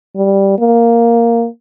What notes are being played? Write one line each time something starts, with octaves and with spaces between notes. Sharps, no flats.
G3
A#3